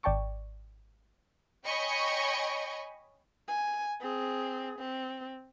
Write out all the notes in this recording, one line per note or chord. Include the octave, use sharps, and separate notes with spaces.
G#1 D5 G5 A5 C#6 D6
C#5 D#5 G5 G#5 B5 C#6
G#5
C4 G#4
C4